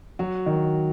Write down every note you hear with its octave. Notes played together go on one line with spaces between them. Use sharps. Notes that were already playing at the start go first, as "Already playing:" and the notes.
F#3 F#4
D#3